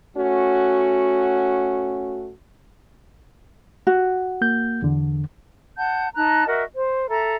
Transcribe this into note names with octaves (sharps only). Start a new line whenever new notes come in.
A3 C#4 F#4
F#4
A#3 G6
E2 D3
F#5 A5 G6
D#4 A5 A#5 F#6
F#4 A#4 D#5 E5
C5
A4 E5 A#5